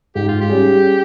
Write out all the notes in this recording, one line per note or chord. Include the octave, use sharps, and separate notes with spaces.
G#2 G4
F4
G4
G3 C#4 G#4